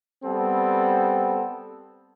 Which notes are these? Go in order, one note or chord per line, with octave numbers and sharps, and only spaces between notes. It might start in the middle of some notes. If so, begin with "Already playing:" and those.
G3 B3 C4 A4